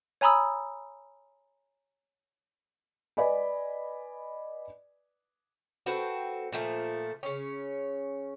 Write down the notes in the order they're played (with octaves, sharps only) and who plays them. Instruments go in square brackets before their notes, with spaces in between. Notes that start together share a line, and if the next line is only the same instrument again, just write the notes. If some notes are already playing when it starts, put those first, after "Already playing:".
[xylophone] C#5 G#5 A#5 B5 D#6 E6
[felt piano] B4 D5 D#5 G#5 B5
[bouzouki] C4 F#4 A4 B4
A#2 F3 A3
C#3 C#4